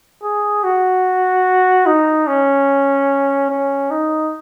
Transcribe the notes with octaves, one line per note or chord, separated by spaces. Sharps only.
G#4
F#4
D#4
C#4
C#4
D#4